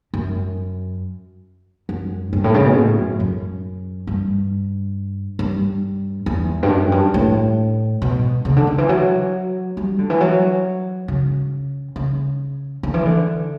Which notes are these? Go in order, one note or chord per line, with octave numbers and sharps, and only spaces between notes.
F#2
F#2
G2
A2
C#3
B2
A2
F#2
F#2
G2
G2
E2
G2
F#2
G2
A2
B2
C#3
D3
D3
E3
F#3
G3
D3
E3
F#3
C#3
C#3
D3
E3
D3